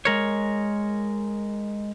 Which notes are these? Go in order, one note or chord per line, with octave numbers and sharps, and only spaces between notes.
G#3 A#4 C#5